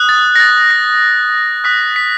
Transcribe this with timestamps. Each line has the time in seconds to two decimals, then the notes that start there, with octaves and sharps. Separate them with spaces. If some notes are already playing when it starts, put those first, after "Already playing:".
Already playing: D#6 F#6
0.09 A6
0.36 A#6
0.40 A6
0.70 A#6
1.64 D#6 F#6 B6
1.96 B6